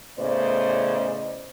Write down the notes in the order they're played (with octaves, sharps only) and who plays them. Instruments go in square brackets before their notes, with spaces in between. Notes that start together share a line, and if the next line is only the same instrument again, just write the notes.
[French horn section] A2 C#3 B3 C5 D5 D#5